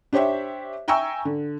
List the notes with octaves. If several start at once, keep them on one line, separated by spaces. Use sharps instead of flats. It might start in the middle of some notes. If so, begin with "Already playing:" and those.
D4 G4 C5 C#5 E5
E5 G5 G#5 A#5 C#6 E6
D3